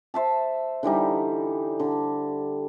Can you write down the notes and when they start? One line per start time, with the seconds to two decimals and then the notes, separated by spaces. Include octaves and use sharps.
0.14 C5 E5 A5
0.83 D3 E3 G3 D#4
1.79 D3